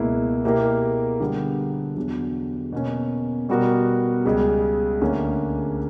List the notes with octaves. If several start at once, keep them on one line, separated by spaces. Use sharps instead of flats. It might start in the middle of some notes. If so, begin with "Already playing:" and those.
Already playing: C#2 B2 A#3 E4
B2 A#3 E4 G4 A#4
D3 G3 B3
E2 D3 F#3
B2 A#3 C#4
B2 G3 B3 F#4 A#4
C#2 C#3 G3
D2 D3 A#3 C#4